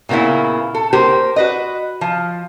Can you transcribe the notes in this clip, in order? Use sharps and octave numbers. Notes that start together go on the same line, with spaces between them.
A#2 C#3 A#3 B3 E4
A4
A#3 G4 A#4 C5
F#4 B4 D#5
F3